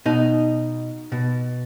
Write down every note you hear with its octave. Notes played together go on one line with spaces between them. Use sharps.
B2 D#4
B2